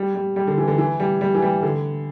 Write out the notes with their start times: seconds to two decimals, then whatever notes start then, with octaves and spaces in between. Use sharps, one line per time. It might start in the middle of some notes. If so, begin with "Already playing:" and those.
Already playing: G3
0.15 G3
0.36 G3
0.47 D3
0.58 E3
0.68 D3
0.78 E3
1.00 G3
1.21 G3
1.34 E3
1.42 G3
1.62 D3